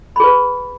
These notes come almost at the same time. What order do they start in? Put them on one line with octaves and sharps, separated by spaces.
B5 G#4 B4